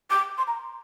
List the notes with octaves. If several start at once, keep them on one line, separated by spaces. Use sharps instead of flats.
D6
C6
A#5